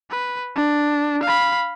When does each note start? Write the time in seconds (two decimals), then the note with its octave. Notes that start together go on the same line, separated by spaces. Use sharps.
0.11 B4
0.56 D4
1.23 F5 B5